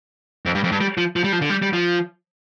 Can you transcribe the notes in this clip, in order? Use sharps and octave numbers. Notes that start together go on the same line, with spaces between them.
F2
G2
F2
G2
G3
F3
F3
G3
F3
D3
G3
G3
F3